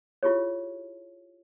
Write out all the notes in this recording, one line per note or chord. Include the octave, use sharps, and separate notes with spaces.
E4 F4 G4 G#4 C#5